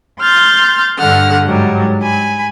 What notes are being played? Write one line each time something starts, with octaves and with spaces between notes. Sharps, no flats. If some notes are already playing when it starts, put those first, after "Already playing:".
C6 F6 G6 A6
G2 D3 F#5 F6
G#2 F#3 G3
G#5 B5